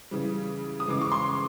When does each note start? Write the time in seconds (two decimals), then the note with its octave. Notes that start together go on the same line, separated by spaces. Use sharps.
0.11 C#3 E3 G3
0.80 D#6
0.87 C#3 E3 G#3 D6
1.02 C#6
1.12 C6